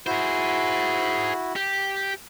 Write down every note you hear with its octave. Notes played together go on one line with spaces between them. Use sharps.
E4 F#4 G#4 C5
G4